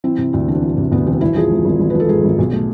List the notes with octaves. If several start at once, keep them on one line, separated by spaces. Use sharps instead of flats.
E3 C4
C3
D2 C4
E1 D4
E3
C3
D2 B3
E1 C4
G#1 E4
F3 G#4
G#2
G#1
G#1
B4
F3
A4
G#2 G#4
G#1
B1
A3